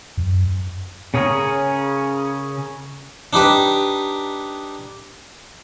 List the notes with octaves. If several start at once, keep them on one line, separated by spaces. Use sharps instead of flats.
F#2
C#3 C#4 G#4 A#4 C#5
D4 D#4 G4 B4